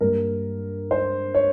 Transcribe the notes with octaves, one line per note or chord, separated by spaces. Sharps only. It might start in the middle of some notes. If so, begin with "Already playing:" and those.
G2 G3 A#3 A#4
C5
C#5